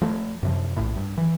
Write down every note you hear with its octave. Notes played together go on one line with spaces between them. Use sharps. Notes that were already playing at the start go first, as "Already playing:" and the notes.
F3 A3
F#2 C3 F3
A#1 A2
G2
E3